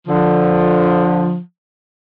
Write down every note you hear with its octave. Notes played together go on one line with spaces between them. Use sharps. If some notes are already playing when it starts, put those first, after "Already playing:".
D3 F3